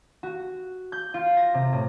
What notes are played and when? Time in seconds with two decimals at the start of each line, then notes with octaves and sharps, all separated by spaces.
0.23 F#4
0.92 G6
1.14 F4
1.37 A#6
1.54 C3
1.73 A2